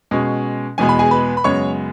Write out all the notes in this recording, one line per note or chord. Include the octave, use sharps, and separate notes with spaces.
B2 G#3 C#4
E2 B2 G#3 B3 G#5
B5
G#4 G#5
B4 B5
B5
F#2 C#3 G#3 B3 C#5 C#6